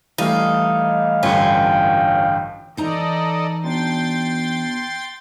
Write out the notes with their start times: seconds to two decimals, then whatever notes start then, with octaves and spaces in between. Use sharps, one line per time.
0.18 E3 G3 A3 D#4 F5
1.23 A1 G2 D3 B3 C#4 F4 G5
2.77 E3 D#4 A4 D5 D#5 A#5
3.64 B2 D4 G5 C6 A6